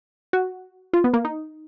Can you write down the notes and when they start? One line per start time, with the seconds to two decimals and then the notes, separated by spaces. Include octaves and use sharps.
0.33 F#4
0.93 F4
1.04 B3
1.14 A#3
1.25 D#4